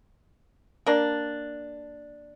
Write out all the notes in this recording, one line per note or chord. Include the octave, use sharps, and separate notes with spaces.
A#3 D4